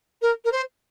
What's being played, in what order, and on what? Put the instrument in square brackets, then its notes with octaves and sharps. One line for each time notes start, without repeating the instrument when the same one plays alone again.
[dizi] A#4
A#4
C5